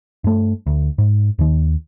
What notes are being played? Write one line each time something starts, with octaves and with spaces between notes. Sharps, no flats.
G2 A3
D2
G#2
D#2 D#3